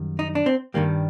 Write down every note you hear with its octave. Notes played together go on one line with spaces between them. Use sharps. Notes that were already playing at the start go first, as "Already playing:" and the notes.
Already playing: F#2 D#3 G3
D#4
D4
C4
G2 D#3 G3 A#3